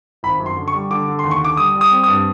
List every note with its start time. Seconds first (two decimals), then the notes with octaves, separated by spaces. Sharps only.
0.23 G#1 B5
0.40 F#2
0.46 C6
0.56 D3
0.68 C#6
0.74 G3
0.90 D3 D6
1.08 D3
1.19 D#2 C6
1.31 C#6
1.41 D3 D6
1.57 G3 D#6
1.75 G3
1.81 D#6
1.91 C4
2.03 D#6
2.08 G2